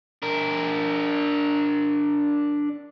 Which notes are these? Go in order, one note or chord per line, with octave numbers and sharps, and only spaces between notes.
D4 A#4